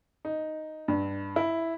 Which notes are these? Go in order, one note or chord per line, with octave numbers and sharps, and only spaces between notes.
D#4
G2
E4